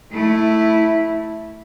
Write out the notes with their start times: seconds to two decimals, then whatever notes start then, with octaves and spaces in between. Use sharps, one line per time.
0.12 A3 E4